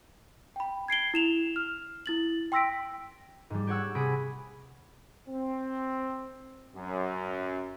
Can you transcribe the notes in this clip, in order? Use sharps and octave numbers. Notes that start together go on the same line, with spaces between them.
G5 B5
G#6 C7 D7 G7
E4 E7 F7
F6
E4 A6 F#7
G5 C6 E6 A#6 B6 D7
G#2 G3
G4 C#5 F#5 E6
C3 G#4 B5 D7
C4
F#2